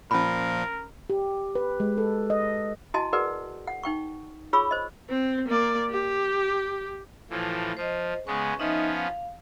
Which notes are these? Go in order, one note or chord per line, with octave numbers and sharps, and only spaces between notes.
A#2 F3 C#4 A#4 B5
G4
B4
G#3
A4
D#5
E4 F#4 D#5 G#5 A5
F#4 G#4 A#4 B4 D5 F#5
F#5
D#4 G5 C#6
F4 G#4 C#5 B5 C#6 E6
C5 D#5
C4
A#3 D5
G4
A2 E3 F3
F3 C5 D#5
C#3 G#3 B3 C#6
F3 B3 C#4 D#4 D#5 E5
F5